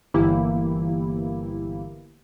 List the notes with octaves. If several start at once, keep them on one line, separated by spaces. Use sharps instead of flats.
G1 E3 A#3 E4 G4